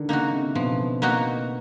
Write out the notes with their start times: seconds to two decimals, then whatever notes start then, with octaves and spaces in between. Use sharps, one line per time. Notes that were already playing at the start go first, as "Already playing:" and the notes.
Already playing: D3 D#3
0.09 C#3 A#3 D#4 F#4
0.32 C3
0.55 B2 F3
1.02 A#3 D#4 F#4